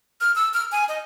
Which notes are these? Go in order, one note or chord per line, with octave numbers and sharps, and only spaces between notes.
F6
E6
F6
G#5
D#5